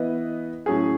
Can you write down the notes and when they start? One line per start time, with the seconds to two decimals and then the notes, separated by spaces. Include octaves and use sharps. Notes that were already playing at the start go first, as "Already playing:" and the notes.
Already playing: E3 B3 E4 B4 D#5
0.66 A2 F#3 C#4 G#4